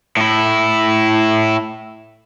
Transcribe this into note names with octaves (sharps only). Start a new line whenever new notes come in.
A2 E4